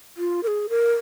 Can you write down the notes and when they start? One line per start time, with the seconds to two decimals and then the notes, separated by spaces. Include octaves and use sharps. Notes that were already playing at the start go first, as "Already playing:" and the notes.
0.17 F4
0.43 A#4
0.47 G#4
0.69 A#4